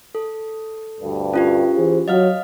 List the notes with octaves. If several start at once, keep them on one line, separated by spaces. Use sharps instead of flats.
A4
D2 G2
C#4 F4 G4
E3 G#4 C5
F#3 D#5 F5 F6